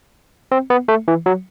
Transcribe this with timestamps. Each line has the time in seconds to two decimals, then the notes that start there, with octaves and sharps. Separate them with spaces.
0.52 C4
0.70 B3
0.88 A3
1.08 E3
1.26 F#3